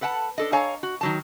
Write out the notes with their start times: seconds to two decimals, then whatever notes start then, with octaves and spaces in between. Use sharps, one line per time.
0.01 A4 B4 F#5 G5 A5
0.38 D4 A4 D#5
0.52 A4 C#5 F5 G#5 A#5
0.83 F#4
1.01 D#3 F#3 A5